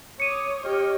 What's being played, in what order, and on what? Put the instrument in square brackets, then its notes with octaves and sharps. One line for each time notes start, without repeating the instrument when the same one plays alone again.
[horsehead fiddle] C#5 [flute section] D6 D#6 [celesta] C#7 D#7
[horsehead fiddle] G4 C#5 [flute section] D#5 F6